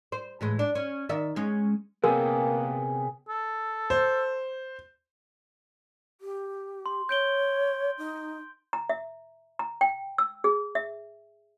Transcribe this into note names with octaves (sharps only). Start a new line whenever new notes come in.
C5
A2 E3 G#3
D4
C#4
D#3 D5 E5
G#3 C#4
C3 A#3 B3 C#4 G#4 A#4 G5
A4
C5
G4
C6
C#5 G6 D7 G7
D#4
A#5
E5
A#5
G5
E6
G#4
E5